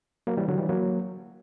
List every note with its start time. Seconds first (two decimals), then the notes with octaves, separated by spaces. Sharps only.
0.27 F#3 A#3
0.37 E3 G3
0.48 D3 F#3
0.58 E3 G3
0.69 F#3 A#3